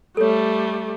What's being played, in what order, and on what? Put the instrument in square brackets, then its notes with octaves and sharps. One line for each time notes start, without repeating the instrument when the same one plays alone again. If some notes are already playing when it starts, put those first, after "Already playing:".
[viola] G3 A3 [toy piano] A4 C#5